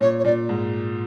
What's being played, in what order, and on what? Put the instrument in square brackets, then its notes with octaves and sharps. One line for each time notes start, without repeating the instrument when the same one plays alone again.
[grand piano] A#2 [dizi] C#5
[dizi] C#5
[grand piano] A#2 [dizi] D5
[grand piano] G#2